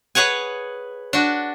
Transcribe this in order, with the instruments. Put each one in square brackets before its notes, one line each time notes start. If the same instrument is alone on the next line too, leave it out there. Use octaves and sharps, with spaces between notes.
[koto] G#4 B4 C#5 F#5 G#5
D4 F#4